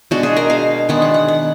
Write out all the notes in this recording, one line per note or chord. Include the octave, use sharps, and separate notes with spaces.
B2 G#3 D4 F#4
G#4
A#4
F5
D#3 G#3 B3 D4 F#5
F#5
F#5
F#5